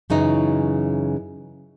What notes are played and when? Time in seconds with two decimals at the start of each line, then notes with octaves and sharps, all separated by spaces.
0.10 F#2 C#3 E3 D#4